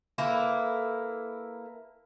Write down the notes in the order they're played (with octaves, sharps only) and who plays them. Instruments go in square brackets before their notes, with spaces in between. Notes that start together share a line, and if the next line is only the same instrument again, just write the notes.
[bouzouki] A#3 E4 A4 B4